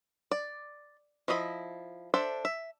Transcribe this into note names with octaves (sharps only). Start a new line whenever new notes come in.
D5
F3 E4 D#5 A#5 B5
D4 A4 C5 E5
E5